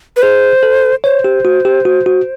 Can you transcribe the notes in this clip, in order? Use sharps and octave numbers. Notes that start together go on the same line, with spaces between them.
B4
G#4 C5
A4
C5 C#5
G4
F#4
G4
F#4
F#4